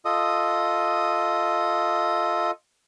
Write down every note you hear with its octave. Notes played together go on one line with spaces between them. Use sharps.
F4 A4 D#5 D#6